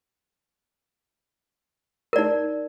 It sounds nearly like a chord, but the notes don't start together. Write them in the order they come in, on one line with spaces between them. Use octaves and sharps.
A#4 D5 D#4